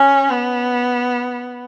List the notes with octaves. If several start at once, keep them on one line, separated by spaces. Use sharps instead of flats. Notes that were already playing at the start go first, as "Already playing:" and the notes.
Already playing: C#4
B3